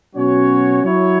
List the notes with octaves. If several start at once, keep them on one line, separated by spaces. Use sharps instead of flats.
B2 F#3 C#4 F#4 C#5
F#3 E4 C#5